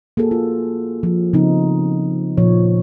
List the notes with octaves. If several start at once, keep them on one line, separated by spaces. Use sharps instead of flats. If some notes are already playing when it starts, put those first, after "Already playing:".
A#3 F#4 G#4 A4
F4
F3
C#3 F3 B3 C4 D#4
A#2 F3 C#5